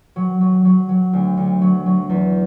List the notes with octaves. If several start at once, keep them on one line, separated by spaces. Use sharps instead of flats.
F#3
F#3
F#3
F#3
D2
D2
F#3
F#3
E2